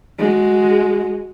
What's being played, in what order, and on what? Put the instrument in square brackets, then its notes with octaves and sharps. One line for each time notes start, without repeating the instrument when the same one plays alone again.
[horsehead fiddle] G#3 F#4